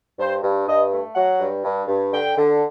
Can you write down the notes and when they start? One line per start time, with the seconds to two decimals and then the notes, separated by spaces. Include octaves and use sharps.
0.19 G2 C5
0.43 G2
0.67 G2 D#5
0.92 A3
1.15 F#3 F#5
1.40 G2
1.64 G2
1.88 G2
2.12 D3 G5
2.37 D3